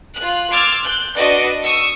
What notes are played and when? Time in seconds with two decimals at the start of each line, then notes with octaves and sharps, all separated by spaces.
0.15 F4 F#6
0.50 C6 D6 E6 F6 G#6 A6
0.83 F#6 G6
1.16 D4 F#4 B4 D5 D#5
1.62 C#6 D#6 E6 C#7